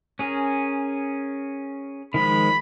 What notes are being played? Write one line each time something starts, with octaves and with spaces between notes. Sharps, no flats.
C#4 G#4 A#4
D#3 F3 G#3 B5